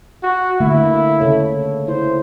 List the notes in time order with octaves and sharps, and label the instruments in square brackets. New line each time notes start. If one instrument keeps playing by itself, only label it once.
[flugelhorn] F#4
[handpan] D3 A3 A#3 [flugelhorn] E4
[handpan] C#3 A4 C#5
[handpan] E4 [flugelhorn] C5